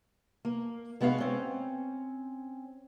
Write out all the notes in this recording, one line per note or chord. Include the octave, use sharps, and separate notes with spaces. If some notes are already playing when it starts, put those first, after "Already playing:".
A#3
G#3 B3 F#4 E5 F5
C4 C#4